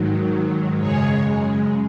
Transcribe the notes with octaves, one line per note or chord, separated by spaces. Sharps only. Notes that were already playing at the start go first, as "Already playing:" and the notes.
Already playing: G#2 D#3 F#3
F#2 C#3 G#3 G#4 C#5